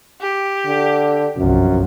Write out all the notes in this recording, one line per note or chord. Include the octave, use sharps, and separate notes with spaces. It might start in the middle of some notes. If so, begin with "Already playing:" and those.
G4
D3
G1 C2 F#2 F3